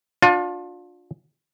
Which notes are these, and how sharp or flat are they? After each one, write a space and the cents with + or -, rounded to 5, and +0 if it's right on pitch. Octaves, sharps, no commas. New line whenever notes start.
D4 +0 F4 +30